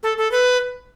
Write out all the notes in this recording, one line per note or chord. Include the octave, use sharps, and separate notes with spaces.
A4
A4
B4